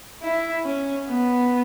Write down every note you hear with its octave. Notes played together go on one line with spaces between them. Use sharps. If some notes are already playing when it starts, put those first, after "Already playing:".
E4
C#4
B3